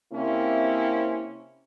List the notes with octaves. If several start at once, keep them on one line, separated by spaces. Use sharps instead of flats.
C3 A#3 C4 C#4 E4